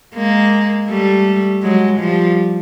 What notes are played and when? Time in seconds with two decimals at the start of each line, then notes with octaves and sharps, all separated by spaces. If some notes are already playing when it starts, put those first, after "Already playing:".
0.15 G#3 A#3
0.89 G3 A3
1.63 F#3 G#3
2.00 F3 G3